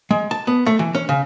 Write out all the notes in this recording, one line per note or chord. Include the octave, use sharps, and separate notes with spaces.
G#3
A5
B3
A3
E3
C#4
C#3